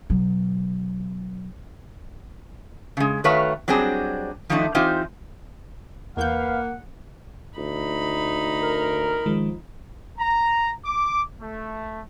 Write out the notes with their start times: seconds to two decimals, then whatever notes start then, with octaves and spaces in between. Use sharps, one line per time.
0.10 B2 F#3
2.97 C#3 G#3
3.24 D#3 A3 F#4 B4 C#5 F5
3.68 F#3 G3 C4 D4 G#4
4.50 D#3 F3 F#3 A3 D4 D#4
4.75 E3 C4 D#4 F4 G4 C5
6.17 E2 A#3 B4 F5 F#5 G6
7.58 D2 D#4 B5
8.62 A#4
9.26 D#3 F3 G#3
10.19 A#5
10.85 D6
11.40 A3